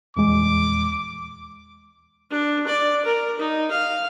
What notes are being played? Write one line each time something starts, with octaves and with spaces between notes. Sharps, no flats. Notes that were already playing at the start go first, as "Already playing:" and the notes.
D#1 E2 G#3 D6
D4
D5
A#4
D#4
F5